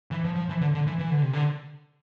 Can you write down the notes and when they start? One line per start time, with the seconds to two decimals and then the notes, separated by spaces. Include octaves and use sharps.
0.11 E3
0.24 F3
0.36 F3
0.49 E3
0.61 D3
0.74 D3
0.86 E3
0.99 E3
1.10 D3
1.22 C3
1.33 D3